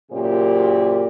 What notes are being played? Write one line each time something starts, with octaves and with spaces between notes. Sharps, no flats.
F#2 A#2 C#3 G4 C5